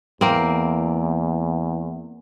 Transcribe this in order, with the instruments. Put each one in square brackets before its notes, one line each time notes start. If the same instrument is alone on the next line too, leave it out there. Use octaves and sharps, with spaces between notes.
[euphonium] E2 [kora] A#3 C4